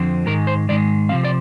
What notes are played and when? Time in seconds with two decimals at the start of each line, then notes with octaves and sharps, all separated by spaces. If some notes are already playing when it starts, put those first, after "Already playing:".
Already playing: F2 D3 F3 C4
0.26 G#2 D#3 G#3 A#4
0.47 C5
0.69 G#2 D#3 G#3 D5
1.09 C3 F3 C4 F5
1.24 D5